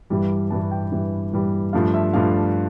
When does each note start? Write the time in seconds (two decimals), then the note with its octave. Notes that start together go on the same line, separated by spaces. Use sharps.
0.10 G2 E3 G3
0.50 G2 E3 G3 A5
0.71 G5
0.92 G2 E3 G3
1.33 G2 E3 G3
1.73 G2 F3 A3 D4 F4 F5
1.94 E5
2.14 G2 F3 A3 D4 F4 F5